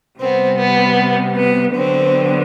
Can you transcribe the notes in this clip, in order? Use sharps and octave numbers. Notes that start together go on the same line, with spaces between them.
C3 G3 B3 C4
B3
B3
D3 F#3 B3 C4